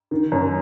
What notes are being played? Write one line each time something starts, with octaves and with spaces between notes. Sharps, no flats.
D#3
F#2